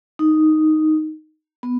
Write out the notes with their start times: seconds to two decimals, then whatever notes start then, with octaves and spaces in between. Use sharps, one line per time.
0.19 D#4
1.63 B3